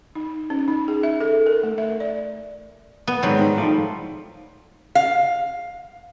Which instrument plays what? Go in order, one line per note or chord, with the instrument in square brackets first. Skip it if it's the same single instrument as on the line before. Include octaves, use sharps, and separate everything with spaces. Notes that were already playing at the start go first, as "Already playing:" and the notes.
[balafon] D#4
C#4
D#4
G#4
E5
A4
A#4
A3
E5
D5
[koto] B3
[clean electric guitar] G#2 D#3 G3 [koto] F#3 C4
[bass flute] D#4
[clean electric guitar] A2 F3 G3
[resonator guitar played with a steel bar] F5